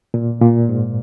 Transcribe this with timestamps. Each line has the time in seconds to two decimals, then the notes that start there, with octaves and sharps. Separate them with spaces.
0.14 A#2
0.41 A#2
0.69 G#2